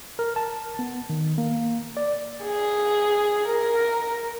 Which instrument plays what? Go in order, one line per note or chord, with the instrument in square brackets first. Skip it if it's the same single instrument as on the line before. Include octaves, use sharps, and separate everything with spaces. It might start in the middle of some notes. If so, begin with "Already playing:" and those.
[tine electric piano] A#4
A5
B3
D#3
A#3
D5
[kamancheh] G#4
A#4